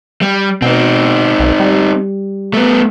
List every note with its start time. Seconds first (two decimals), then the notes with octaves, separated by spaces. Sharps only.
0.21 G3
0.62 B2 C4 D#4
1.39 B1
1.60 G3
2.54 A3 B3